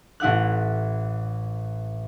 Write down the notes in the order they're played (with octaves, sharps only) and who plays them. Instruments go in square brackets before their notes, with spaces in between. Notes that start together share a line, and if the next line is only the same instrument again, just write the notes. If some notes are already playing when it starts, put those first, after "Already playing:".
[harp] A1 E4 F#5 F#6